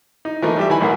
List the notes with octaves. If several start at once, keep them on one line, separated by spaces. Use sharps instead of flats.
D#4
E3 F3 A3 A#3 D#4
G3 G4 E5
E3 D#4 G#5 B5
B1 A2 A#3 F#5